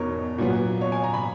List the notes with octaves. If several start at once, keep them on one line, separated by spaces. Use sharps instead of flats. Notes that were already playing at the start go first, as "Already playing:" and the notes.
Already playing: E2 B2 D#4 A#4 C#5
A#2 F#3 B3
C#5
G#5
A#5
B5